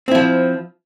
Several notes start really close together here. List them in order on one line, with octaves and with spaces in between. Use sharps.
C4 E4 F3